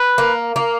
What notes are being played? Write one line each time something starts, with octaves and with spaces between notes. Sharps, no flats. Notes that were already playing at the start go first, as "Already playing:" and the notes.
Already playing: B4
A#3
A#3